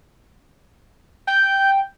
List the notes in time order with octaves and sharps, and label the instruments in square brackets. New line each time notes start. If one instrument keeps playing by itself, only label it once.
[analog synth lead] G5 [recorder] G6